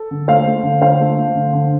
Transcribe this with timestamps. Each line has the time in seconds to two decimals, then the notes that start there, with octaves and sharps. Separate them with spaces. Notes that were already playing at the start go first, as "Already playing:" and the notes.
Already playing: A4
0.11 D3
0.28 A3 C5 F5
0.46 A3
0.63 D3
0.82 D3 C5 F5
1.00 A3
1.17 A3
1.35 D3
1.53 D3